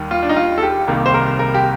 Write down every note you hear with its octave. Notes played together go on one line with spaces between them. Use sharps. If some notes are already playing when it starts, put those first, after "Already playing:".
Already playing: D#2 D#3 G3
F4
D4
D#4
F4
A4
G4
C2 C3 D#3 G3 A#3
C5
A#4
A#4
G4